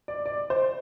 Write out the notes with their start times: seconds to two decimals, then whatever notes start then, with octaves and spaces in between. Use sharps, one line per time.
0.08 D5
0.26 D5
0.50 C5